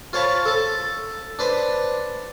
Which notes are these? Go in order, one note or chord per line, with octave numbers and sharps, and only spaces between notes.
F4 C5 C#5 A5 B5
A4 A5
D4 B4 C5